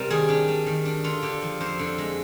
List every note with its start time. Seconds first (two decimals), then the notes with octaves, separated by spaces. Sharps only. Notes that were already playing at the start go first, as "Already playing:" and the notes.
Already playing: C3 G3 A#4
0.10 D#3 G#4
0.29 D4 G4
0.48 G3
0.66 D#3
0.85 D4
1.04 D3 F4
1.22 D3 G4
1.42 F3
1.60 F2 C5
1.79 D3
1.98 G#3